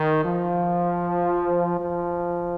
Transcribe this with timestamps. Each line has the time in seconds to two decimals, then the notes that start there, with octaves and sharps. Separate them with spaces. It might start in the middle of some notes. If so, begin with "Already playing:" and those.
Already playing: D#3
0.24 F3
1.78 F3